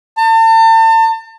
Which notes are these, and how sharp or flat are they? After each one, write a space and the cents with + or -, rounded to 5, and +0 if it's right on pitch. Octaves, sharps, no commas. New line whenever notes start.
A5 +40